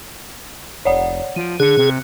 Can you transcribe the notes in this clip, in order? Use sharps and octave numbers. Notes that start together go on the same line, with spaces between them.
F1 C#5 D5 F#5
F3 D7 D#7
D3 G#4 F#6 C#7
C3